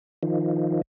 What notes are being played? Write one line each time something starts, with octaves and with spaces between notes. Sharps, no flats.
D#3 F3